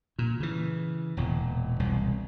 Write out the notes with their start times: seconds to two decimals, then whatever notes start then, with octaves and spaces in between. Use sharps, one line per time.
0.19 A#2
0.40 C#3 E3
1.17 E1 E2 A#2
1.79 E1 C2